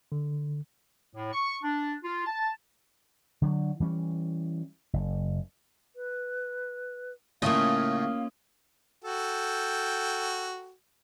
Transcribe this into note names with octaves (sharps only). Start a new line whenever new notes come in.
D3
A2
C#6
D4
F4
A5
D3 F#3
E3 G3 C#4
F#1
B4
A2 C#3 A3 A#3 C#4 F4 D#5 F5
F#4 A4 G5